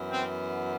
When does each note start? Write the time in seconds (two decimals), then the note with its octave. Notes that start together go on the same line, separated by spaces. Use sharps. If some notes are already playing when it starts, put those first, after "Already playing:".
Already playing: F#2 E3 B3
0.11 C4